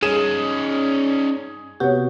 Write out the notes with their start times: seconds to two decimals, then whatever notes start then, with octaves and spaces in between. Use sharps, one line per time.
0.03 G2 C#4 D#4 G#4 D#7 E7
1.80 C3 B3 F#4 G4 C#5